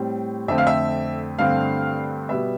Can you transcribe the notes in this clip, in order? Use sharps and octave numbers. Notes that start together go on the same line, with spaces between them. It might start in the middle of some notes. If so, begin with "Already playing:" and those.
Already playing: A2 G3 C4
F2 D3 A3 C4 E5
F5
E5
G2 D3 A3 C4 F5
B2 G3 B3 E5